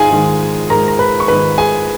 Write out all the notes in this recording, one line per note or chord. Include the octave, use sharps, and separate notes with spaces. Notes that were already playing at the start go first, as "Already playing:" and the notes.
Already playing: G#2 G#3 D#4 F4 G#4 G#5
G#2 D#3 G#3
G#2 D#3 G#3 A#4 A#5
A#5
B4 B5
C#6
G#2 D#3 G#3 B4 B5
G#4 G#5